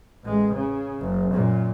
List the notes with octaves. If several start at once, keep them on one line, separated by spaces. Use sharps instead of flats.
A1 G#3
C#3
F#1
F#2 A#2